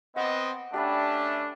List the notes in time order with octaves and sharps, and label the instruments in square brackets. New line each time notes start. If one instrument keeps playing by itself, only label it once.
[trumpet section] B3 C4 D#5 [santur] F#5 D6
[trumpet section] A3 C#4 D4 [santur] G4 E5 B5